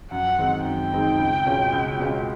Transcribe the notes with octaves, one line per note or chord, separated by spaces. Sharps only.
F#2 F#5
D#3 G#3 C4 D#4
F#2 G5
D#3 G#3 C4 D#4
C#2
B2 G#3 C#4 F4
C#2
B2 G#3 C#4 F4